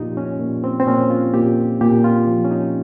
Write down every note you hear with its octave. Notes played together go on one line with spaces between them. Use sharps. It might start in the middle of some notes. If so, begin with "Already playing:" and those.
Already playing: A#2 F3 D#4 F4 G4
C#4
A#2
C4
C4
A#2 C#4
F4
A#2 G4
A#2 G4
F4
F3
C#4
D#4